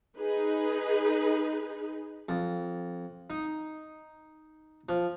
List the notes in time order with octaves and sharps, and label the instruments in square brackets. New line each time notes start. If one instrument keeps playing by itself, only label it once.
[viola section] D#4 G#4 B4
[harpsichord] F2
D#4
F3